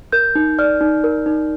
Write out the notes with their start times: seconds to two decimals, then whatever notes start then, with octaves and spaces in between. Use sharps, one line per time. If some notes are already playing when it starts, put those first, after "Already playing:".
0.12 A#4 G6
0.35 D#4
0.59 D5 F6
0.81 D#4
1.04 A#4
1.26 D#4